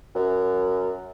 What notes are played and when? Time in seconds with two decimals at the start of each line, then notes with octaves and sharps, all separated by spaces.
0.15 F#2